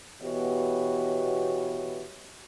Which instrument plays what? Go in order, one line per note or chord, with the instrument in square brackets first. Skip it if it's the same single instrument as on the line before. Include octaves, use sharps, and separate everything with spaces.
[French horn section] B2 E3 B3 F#4 G4 C#5